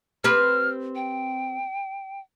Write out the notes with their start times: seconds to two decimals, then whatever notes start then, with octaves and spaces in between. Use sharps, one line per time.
0.24 C4 G4 B4 F6
0.95 G5